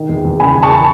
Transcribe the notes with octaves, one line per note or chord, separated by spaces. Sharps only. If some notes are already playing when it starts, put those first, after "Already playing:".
Already playing: D#3
E2
E2
C#3 G#5 B5
E2
A5 C#6